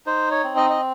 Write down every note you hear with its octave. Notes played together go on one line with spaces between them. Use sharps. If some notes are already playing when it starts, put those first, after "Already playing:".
D#4 C5
C#5
C4
D#5
D#5